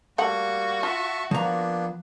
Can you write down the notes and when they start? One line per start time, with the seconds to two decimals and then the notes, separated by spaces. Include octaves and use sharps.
0.18 G3 A3 A#3 F#4 F#5 C#6
0.83 F4 E5 A5 C#6
1.31 F3 A#3 B3 D4 A#5